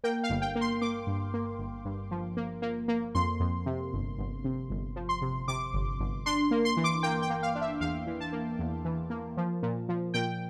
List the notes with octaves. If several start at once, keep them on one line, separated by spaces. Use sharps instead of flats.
A#3 G5
F5
G1
G5
A#3
C6
A#3 D6
G2
A#3
G1
G2
F3
A#3
A#3
A#3
F2 C6
F2
C3
G1
G1
C3
G1
F3
C6
C3
C3 D6
G1
G1
D4 C6
A#3
C6
E3
D6
A#3 G5
G5
A#3
F5
D4
E5
E2 F5
E3
A5
A#3
E2
E3
A#3
F3
A#2
F3
A#2 G5